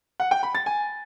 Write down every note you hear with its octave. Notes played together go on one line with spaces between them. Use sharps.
F#5
G5
B5
A6
G#5